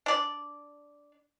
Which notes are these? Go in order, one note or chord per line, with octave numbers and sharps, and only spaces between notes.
D4 D5